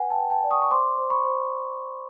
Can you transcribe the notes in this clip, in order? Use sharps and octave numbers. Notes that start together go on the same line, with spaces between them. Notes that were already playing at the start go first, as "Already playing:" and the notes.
Already playing: B4 F#5 G#5
G5 A5
B4
G5 A5
D5
C#6 D#6
C#6
C5 C6 D6
C5
B5 C#6
C5